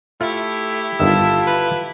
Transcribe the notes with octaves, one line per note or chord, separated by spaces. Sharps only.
A3 E4 F4 G4
G1 D#3 F4 A4 E5
B4